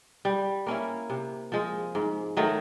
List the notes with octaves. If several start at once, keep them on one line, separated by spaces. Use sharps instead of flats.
G3
A#3 C#4 E4
C3
F3 G#3
G#2
D#3 F#3 A3